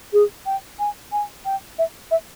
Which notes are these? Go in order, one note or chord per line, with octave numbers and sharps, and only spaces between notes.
G#4
G5
G#5
G#5
G5
E5
E5